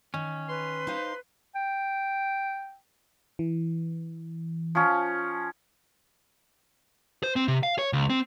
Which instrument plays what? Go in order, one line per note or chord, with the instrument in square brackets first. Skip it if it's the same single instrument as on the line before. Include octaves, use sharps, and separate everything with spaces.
[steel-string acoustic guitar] D#3 [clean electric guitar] C#4
[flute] B4 [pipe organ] C6
[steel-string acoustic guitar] D#4 C5 F5
[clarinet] G5
[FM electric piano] E3
[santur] F3 C#4
[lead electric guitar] C5
C4
C3
F5
C#5
C#2
C4